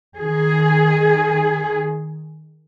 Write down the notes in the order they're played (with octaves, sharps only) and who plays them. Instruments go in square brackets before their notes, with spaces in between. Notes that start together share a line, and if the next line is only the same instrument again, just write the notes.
[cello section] D#3 G#4